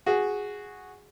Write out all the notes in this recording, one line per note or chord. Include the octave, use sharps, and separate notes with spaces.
F#4 G#4